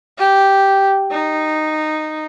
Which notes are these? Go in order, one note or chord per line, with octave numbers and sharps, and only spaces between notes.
G4
D#4